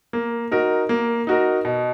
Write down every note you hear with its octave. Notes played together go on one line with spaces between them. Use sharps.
A#3
D#4 F#4 A#4
A#3
D#4 F#4 A#4
B2